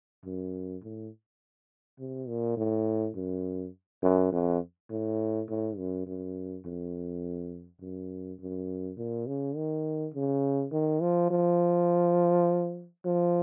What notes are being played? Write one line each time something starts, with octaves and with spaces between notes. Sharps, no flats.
F#2
A2
C3
A#2
A2
F#2
F#2
F2
A2
A2
F#2
F#2
F2
F#2
F#2
A#2
C#3
D#3
C#3
D#3
F3
F3
F3